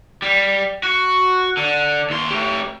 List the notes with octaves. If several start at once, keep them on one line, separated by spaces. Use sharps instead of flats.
G3
F#4
D3
D#2 C6
A3 G4